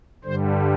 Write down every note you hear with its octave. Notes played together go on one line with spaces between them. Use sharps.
G2 D3 G3 C5